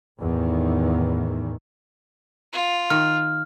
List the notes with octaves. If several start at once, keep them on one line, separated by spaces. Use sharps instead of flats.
E2 A2 D#3
F4
D#3 F6